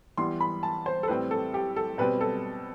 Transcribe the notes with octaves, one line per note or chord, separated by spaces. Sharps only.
E3 G3 B3 C6
B5
A5
C5
A4
A2 G3 C4 B4
A4
G4
A4
B2 G3 C4 B4
A4